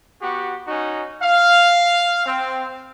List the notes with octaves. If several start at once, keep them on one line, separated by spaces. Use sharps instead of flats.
B3 F#4 G4
C#4 D#4 F#4
F5
C4